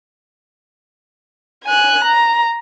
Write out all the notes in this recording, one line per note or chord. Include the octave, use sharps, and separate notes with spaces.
G#5 F#6
A#5